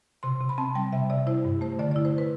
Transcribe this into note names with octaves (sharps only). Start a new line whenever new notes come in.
C3 C6
C3
B5
C4 A5
G3 G5
C3 E5
C3 D5
E4 C5
G2
A3 C5
D3 D5
D5
E4
C5
B4